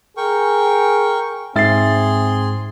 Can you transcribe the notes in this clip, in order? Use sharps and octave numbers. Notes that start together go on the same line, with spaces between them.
G#4 A#4 G5 C#6
G#2 C4 G#4 E5 C6 A6 C7